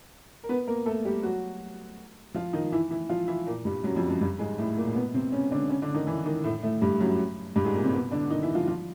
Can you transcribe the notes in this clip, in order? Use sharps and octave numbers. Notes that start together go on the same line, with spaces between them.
A#4
B3 B4
A#3 A#4
A3 A4
G3 G4
F#3 F#4
F3 F4
D#3 D#4
E3 E4
E3 E4
F3 F4
E3 E4
A#2 A#3
G2 G3
F#2 F#3
F2 F3
F#2 F#3
G2 G3
G#2 G#3
A2 A3
A#2 A#3
B2 B3
C3 C4
C#3 C#4
D3 D4
C#3 C#4
D3 D4
D#3 D#4
E3 E4
D#3 D#4
A2 A3
A2 A3
G2 G3
F#2 F#3
G2 G3
G#2 G#3
A#2 A#3
C3 C4
B2 B3
D3 D4
D#3 D#4
E3 E4
F3 F4
F3 F4